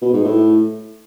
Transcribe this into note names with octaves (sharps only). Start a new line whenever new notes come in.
B2
G#2
A2